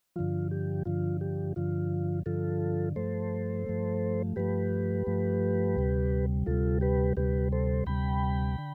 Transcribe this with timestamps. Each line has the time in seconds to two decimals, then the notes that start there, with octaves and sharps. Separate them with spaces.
0.16 G2 D3 F3 F4
0.51 G4
0.85 G2 D3 F3 F4
1.21 G4
1.56 G2 D3 F3 F4
2.26 G2 D3 F3 F4 A4
2.96 G2 F3 A3 A4 C5
3.66 G2 F3 A3
4.36 G2 F3 A3 G4 B4
5.07 G2 F3 A3
5.76 D2 C3 G3
6.46 D2 C3 G3 F4 A4
6.81 G4 B4
7.17 D2 C3 G3 G4 B4
7.52 A4 C5
7.86 D2 C3 G3 G5 B5
8.58 D3